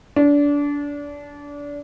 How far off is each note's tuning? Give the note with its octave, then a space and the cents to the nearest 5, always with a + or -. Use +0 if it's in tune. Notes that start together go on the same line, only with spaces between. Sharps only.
D4 -25